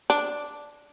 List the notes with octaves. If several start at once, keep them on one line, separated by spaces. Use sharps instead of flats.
D4